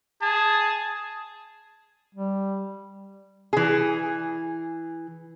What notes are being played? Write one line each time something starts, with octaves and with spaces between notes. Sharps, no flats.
G#4 A5
G3
E3 G#4